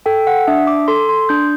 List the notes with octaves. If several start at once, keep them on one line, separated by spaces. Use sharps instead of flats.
A4 G5
F#5
D4 E5
D6
A4 C6
C6
D4 G6